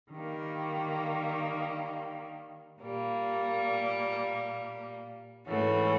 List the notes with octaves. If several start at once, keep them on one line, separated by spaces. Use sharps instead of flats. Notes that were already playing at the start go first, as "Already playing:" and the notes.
D#3 G3 A#3
A#2 G3 A#3
G#2 E3 A3 C#4 F#4